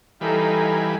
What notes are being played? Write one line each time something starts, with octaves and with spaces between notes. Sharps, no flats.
E3 G3 D#4 A4 B4 F5 G#5 A#5